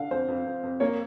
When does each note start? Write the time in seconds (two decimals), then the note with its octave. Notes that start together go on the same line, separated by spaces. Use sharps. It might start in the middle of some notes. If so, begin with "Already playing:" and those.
Already playing: D3 F5
0.11 F2 C5
0.28 F2
0.46 F2
0.63 F2
0.80 A#3 C#5